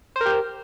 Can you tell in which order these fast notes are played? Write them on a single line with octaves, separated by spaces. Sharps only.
C5 A#4 G4